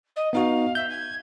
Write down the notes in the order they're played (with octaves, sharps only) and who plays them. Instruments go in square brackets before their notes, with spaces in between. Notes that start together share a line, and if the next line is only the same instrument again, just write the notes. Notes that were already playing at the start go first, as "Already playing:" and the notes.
[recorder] D#5
[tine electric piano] B3 D#4 F#4 [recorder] F5
[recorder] E5 [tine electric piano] G6
[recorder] G#6